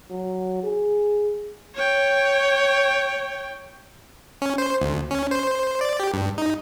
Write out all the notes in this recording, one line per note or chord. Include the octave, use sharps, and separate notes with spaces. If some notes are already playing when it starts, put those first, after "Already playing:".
F#3
G#4
C#5 G5
C#4
C5
D2
C#4
C5
D5
G4
G2
D#4